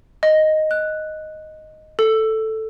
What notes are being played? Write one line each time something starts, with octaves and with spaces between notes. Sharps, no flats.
D#5
F#6
A4